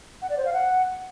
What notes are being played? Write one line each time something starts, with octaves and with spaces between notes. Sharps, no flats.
F#5
D5
C5
F5
F#5